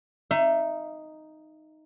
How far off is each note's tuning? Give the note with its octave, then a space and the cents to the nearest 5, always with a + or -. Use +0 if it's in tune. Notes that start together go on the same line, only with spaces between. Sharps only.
D#4 +0 E5 +25